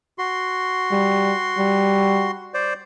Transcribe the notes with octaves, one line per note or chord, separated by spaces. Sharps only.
F#4 C6
G3
G3
C5 D5